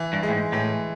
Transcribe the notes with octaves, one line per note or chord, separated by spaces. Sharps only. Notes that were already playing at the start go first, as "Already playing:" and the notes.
Already playing: E3
G2
G#3
A2
G#2
A2 E3